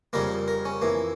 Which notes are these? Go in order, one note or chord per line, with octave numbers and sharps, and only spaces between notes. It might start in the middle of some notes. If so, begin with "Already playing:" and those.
F2 C#3 G3 A#3 A#4
A#4
C#4
F2 E3 A#3